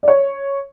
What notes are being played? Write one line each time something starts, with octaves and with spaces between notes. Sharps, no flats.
D5
C#5